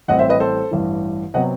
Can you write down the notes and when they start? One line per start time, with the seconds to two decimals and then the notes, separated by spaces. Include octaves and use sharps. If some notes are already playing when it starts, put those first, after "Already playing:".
0.08 A1 A2 G3 C4 D#5 F#5
0.19 C5 E5
0.29 B4 D#5
0.40 A4 C5
0.71 A1 G2 E3
1.34 C3 F#3 B3 D#5 F#5